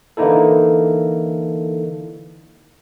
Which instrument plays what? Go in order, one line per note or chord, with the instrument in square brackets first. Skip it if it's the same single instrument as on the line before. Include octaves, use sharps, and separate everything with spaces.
[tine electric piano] D3 E3 A#3 D#4 E4 A4